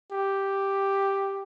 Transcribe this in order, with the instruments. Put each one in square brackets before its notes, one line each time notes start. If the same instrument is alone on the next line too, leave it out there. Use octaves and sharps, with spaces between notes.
[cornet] G4